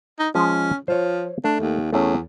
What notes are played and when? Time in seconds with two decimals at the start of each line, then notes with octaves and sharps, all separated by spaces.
0.19 D#4
0.35 F3 G#3 C#4
0.88 F3 C5 C#5
1.44 A3 D4
1.61 D#2
1.93 E2 A3 C#4